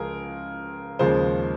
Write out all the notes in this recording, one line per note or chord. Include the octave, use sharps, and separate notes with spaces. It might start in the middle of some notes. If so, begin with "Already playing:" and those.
Already playing: C#2 F3 G#3 G#4 A#4
D#2 C#3 F3 G#3 C5